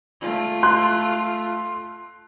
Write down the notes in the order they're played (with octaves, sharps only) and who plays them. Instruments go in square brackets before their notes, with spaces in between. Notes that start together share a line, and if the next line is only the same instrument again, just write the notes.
[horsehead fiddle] A3 F4
[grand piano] C6 F#6